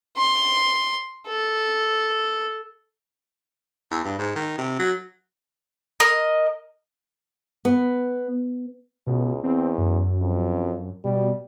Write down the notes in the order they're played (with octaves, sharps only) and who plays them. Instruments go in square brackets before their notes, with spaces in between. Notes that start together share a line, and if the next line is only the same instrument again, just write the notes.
[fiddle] C6
A4
[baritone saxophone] E2
G2
G#2
D#3
C3
F#3
[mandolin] A#4 D#5
[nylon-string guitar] B3
[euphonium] C#2 [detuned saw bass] B2
[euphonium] E2 [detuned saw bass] C4
[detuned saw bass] F#2
[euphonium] F2
[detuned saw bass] B2 [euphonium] G3